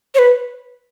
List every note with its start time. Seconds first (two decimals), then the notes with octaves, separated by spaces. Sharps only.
0.15 C#5
0.19 B4